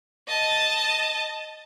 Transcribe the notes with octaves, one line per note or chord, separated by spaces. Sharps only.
D#5 A5